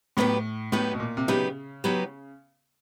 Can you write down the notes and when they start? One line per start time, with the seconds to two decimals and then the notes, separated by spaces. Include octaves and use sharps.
0.17 A2 F#3 B3 D#4 G4 B4
0.72 A2 F#3 B3 D#4 G4 B4
0.94 B2
1.00 A#2
1.17 C3
1.28 C#3 F#3 B3 D#4 G4 B4
1.84 F#3 B3 D#4 G4 B4